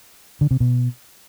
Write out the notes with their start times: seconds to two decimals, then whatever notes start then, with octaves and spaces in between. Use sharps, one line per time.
0.41 D3
0.51 C3
0.60 B2